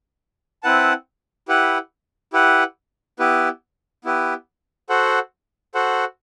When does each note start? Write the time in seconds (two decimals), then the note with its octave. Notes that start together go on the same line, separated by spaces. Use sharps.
0.63 C4 E4 B4 F#5 A5
1.48 E4 G4 B4 F#5
2.33 E4 G4 B4 F#5
3.19 B3 E4 G4 B4
4.05 B3 E4 G4 B4
4.89 F#4 A4 C5 F#5
5.75 F#4 A4 C5 F#5